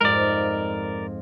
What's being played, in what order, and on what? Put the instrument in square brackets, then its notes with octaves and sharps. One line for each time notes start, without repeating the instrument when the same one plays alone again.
[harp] F2 G#2 G#3 [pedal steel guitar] A#4 D5